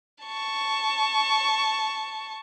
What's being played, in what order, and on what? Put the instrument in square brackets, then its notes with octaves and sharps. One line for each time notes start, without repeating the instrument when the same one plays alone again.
[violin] A5 C#6